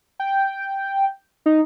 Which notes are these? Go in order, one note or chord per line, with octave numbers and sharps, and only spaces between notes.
G5
D#4